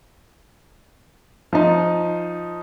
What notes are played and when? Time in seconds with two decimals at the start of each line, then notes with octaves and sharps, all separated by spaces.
1.53 F3 D#4